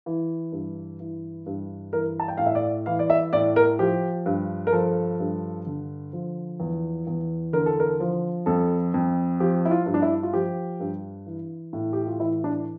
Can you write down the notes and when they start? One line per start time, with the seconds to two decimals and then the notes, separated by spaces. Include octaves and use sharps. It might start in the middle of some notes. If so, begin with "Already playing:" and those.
0.06 E3
0.52 G2
1.00 E3
1.46 G2
1.93 E3 A#4
2.20 A5
2.28 G5
2.37 A2 F5
2.46 E5
2.55 D5
2.86 E3 F5
2.99 D5
3.10 E5
3.33 A2 D5
3.56 A#4
3.79 F3 G4
4.26 G2
4.67 A#4
4.73 F3 A4
5.20 G2
5.66 D3
6.13 F3
6.60 E2
7.07 E2
7.53 D3 A#4
7.66 A4
7.80 A#4
8.00 F3
8.46 F2 A4
8.94 F2
9.40 F3 G4
9.65 E4
9.71 F4
9.86 G2
9.94 D4
10.02 E4
10.23 F4
10.33 F3 G4
10.80 G2
11.26 E3
11.73 A2
11.93 G4
12.07 F4
12.20 E3 E4
12.44 D4